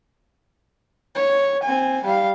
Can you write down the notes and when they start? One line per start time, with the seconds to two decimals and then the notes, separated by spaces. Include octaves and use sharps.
1.15 C#5
1.63 C4 G#5
2.04 G3 F5